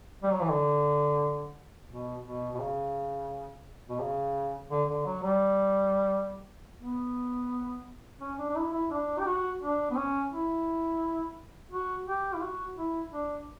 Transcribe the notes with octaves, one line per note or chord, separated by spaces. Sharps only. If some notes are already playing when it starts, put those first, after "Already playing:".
G3
F#3
E3
D3
B2
B2
B2
C#3
B2
C#3
D3
D3
F#3
G3
B3
C#4
D4
D4
E4
E4
D4
G4
F#4
D4
B3
C#4
E4
F#4
G4
E4
F#4
E4
D4